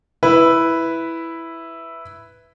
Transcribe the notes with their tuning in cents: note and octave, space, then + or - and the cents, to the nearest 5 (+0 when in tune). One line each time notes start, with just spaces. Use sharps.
E4 +0 B4 +0